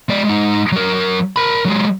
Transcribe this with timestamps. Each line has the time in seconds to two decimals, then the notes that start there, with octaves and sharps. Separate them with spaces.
0.09 G#3 D5
0.25 G#3 D#4
0.72 F#3 A#4
1.36 A#4 B5
1.65 F#3 G#3